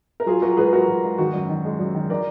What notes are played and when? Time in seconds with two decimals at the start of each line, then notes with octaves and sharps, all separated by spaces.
0.20 A#4
0.26 F#3 F4 G#4
0.42 F#3 F#4 A#4
0.57 G#2 G#4 B4
0.72 F#3 F#4 A#4
0.88 G#2
1.04 G#2
1.18 D#3 F#4
1.33 F#2
1.49 D#3
1.65 G#3
1.79 F#2
1.95 D#3
2.10 D#3 A#4 D5